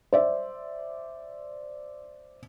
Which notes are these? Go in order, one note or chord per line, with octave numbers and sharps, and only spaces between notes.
C5 D5 E5